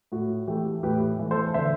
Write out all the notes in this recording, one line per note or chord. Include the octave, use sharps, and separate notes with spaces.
A2 F#4
E3 A3 G4
A2 G4 B4
E3 A3
A4 C5
D3 C5 E5